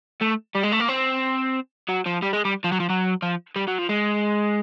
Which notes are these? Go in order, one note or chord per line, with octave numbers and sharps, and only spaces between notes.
A3
G3
G#3
A3
A#3
C4
F#3
F3
G3
G#3
G3
F3
F#3
F3
F#3
F3
G3
F#3
F3
G#3